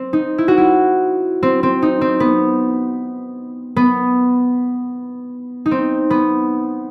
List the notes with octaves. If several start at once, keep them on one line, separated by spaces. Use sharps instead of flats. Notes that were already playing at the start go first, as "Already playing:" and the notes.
Already playing: C4
D#4
E4
F#4
E4
C4
C4
D#4
C4
B3
B3
D#4
C4
B3